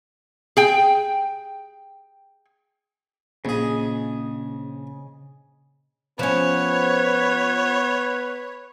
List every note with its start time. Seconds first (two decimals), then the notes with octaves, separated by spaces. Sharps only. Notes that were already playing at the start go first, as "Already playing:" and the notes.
0.57 G#4 G5
3.45 A#1 C#3 G#4 D#5
6.19 F3 B3 C#4 B4 C#5